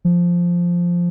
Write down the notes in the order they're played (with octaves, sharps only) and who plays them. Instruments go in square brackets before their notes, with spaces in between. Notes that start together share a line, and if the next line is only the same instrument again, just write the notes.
[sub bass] F3